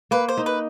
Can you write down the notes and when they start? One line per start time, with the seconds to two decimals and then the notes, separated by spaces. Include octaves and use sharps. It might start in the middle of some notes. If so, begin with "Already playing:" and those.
0.11 A#3 B4
0.29 C5
0.37 D#4
0.46 B4